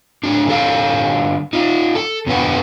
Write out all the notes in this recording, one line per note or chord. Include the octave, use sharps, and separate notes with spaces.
D3 F#3 D4
D3 G3 A4 F5
D#4 F4
A4
F2 B2 D3 B3 B4 F#5